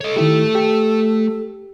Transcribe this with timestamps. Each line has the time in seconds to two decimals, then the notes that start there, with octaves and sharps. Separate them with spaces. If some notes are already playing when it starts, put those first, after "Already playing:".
0.01 A4 C#5 D#5
0.16 D#3 A3 E4 G4 E5
0.55 G4